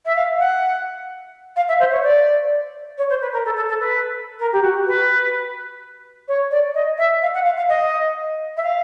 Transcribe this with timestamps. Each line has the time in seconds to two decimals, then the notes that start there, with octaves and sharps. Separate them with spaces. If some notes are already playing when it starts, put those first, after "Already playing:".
0.05 E5
0.15 F5
0.39 F#5
1.56 F5
1.68 E5
1.79 C5
1.91 C#5
2.03 D5
2.98 C#5
3.09 C5
3.21 B4
3.32 A#4
3.45 A4
3.56 A4
3.68 A4
3.80 B4
4.39 A#4
4.52 G4
4.62 F#4
4.86 B4
6.28 C#5
6.50 D5
6.74 D#5
6.98 E5
7.22 F5
7.33 F#5
7.45 F5
7.56 F5
7.69 D#5
8.56 E5
8.63 F5